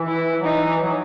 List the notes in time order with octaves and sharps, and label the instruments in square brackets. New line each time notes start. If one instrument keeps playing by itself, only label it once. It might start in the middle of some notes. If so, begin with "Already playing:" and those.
Already playing: [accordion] E3
[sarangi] E4
[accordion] F#3
[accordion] E3 [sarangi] D#4
[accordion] F#3